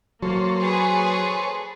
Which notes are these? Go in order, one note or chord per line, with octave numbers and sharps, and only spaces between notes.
F#3 A#3 A4 C5 C#5
G#4 B4